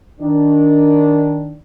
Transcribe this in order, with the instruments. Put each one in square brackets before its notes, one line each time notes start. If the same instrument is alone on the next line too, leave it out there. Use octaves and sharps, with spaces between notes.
[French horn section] D#3 D4